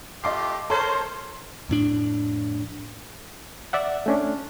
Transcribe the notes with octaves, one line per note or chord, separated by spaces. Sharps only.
A3 F4 G4 D#5 D6 C7
A4 A#4 C5 C#5 G#6
F2 A2 D4
D5 E5 F#5
A3 C#4 D4